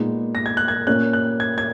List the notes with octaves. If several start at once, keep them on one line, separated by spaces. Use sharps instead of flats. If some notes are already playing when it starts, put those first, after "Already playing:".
Already playing: A#2 G#3 B3 D#4
A#6
G#6
F#6
G#6
A#2 A#3 C#4 F#6
F#6
G#6
G#6